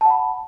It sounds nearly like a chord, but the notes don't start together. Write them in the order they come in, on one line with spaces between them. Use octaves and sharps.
A5 F#5 B5